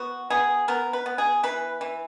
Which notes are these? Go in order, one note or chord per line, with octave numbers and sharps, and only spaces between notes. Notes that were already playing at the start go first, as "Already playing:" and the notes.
Already playing: B3 F#4
B3 G#4
B3 A#4
B4
B3
G#4
E3 B4
E3